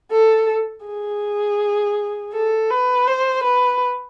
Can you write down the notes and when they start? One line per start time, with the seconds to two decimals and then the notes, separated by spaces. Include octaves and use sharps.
0.12 A4
0.86 G#4
2.33 A4
2.70 B4
3.07 C5
3.43 B4